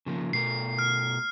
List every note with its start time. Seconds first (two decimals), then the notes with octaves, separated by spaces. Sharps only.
0.06 C#3 F3 A#3
0.33 B2 A3 A#4 C7
0.79 F6